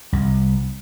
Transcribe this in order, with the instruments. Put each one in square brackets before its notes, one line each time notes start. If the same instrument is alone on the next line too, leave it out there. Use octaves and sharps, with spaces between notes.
[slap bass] C2